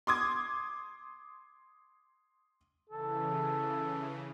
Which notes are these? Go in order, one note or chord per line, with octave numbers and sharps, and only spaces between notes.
C6 D6 D#6 G#6
C#3 E3 A4